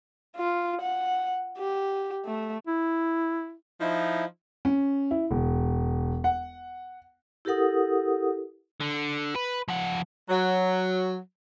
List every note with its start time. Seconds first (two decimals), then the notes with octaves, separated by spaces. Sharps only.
0.36 F4
0.81 F#5
1.58 G4
2.25 A3
2.67 E4
3.81 F3 D#4 E4
4.65 C#4
5.11 E4
5.31 E1
6.24 F#5
7.45 E4 G4 A4 A#4 F#5 D#6
8.80 D3
9.35 B4
9.68 F3 F#5
10.29 F#3